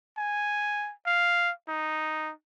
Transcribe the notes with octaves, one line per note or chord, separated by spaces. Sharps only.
G#5
F5
D#4